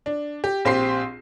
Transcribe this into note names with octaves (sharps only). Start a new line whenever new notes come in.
D4
G4
A#1 C4 G4 C6 C7